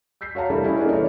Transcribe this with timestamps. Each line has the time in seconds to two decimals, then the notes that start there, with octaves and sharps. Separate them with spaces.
0.21 E6 G6 B6 C7
0.35 F#4 C#5 F5 A5 A#5
0.50 G3 A3 D4 E4 A4 A#4
0.64 C#4 E4 D#5
0.79 A#3 D4 D#4 G#4 A4 B4
0.93 E3 A4 C#5 D5